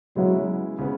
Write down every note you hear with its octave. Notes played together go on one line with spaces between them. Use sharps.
C#3 F#3 G#3 B3 E4
C#3 G#3 B3